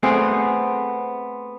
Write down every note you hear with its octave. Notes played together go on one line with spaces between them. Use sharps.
A3 B3 C4 G#4